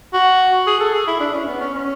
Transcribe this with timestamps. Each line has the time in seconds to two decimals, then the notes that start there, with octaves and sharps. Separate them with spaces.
0.13 F#4
0.67 G#4
0.80 A4
0.94 G#4
1.07 E4
1.20 D4
1.34 C#4
1.47 B3
1.60 C#4
1.75 C#4